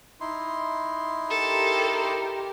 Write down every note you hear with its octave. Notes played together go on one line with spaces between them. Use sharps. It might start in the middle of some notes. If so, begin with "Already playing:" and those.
D#4 E4 C6
G4 A4 A#4